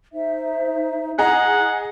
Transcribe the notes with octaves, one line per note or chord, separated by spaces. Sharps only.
D#4 C5 E5
E4 G#4 D#5 F#5 A#5